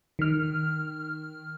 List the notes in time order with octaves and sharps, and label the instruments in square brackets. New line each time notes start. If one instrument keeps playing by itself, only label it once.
[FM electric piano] D#3 F6